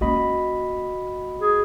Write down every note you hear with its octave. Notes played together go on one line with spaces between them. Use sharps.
A#3 C#4 F#4 D#5 B5
G#4